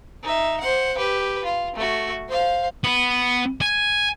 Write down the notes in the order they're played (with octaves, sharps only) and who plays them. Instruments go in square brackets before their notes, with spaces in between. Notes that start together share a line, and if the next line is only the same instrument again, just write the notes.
[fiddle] D#4 E5
C5 F#5
G4 B4
F4
A3 F#4
C5 F5
[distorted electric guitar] B3
G#5